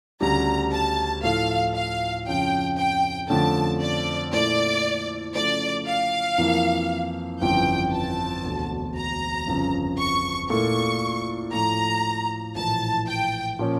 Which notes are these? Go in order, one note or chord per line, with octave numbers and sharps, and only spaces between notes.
D2 C#3 G3 D4 A#5
A5
A2 F3 A3 E4 A4 F5
F5
F2 C#3 F3 C#4 G5
G5
F2 D3 A3 C#4 A5
D5
A#2 A3 E4 D5
C#3 F3 A3 D5
F5
F2 E3 A#3 E4
G1 F2 C#3 E3 G5
A5
E1 D2 D3
A#5
G1 F2 C#3
C#6
A#2 A3 E4 A4 C#6
A2 F3 A3 A#5
A#1 A2 E3 A5
G5
A#2 F3 C#4